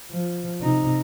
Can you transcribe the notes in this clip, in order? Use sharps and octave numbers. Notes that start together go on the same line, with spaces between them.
F3
C3 D#4